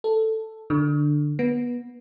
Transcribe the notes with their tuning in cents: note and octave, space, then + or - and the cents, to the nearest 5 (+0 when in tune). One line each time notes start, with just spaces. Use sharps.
A4 +5
D3 +10
B3 -20